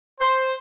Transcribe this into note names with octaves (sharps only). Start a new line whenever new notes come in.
C5